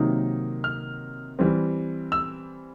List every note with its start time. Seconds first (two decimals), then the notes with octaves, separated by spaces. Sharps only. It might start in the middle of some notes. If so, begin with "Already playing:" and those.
Already playing: C3 D#3 F#3 A#3 D#4
0.64 F6
1.39 E3 G3 C4
2.12 E6